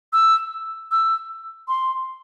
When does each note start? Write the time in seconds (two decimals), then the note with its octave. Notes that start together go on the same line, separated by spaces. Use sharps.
0.13 E6
0.91 E6
1.68 C6